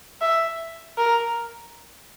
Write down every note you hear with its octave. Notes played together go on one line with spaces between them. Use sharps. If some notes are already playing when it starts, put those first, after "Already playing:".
E5
A#4